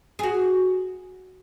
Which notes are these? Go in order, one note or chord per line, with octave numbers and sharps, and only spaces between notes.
F#4 G#4